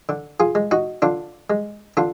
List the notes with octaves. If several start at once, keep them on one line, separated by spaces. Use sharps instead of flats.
D3
F4 G#4
G#3
D#4 F#4
D3 D4 F4
G#3
D3 D4 F4